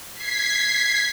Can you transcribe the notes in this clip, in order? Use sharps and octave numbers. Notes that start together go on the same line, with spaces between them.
G#6 B6 C7